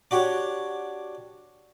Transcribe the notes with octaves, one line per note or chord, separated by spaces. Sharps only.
D4 F#4 G4 C#5